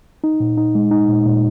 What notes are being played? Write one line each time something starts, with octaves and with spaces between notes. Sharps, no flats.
D#4
A#2
D#4
G#3
D#4
A#2
A#2